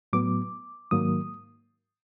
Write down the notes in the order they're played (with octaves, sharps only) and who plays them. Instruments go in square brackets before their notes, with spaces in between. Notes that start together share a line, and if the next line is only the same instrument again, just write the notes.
[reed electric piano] A2 F#3 B3 D6
G#2 D#3 F#3 A#3 D#6